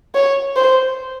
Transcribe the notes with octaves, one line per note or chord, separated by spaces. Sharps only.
C#5
C5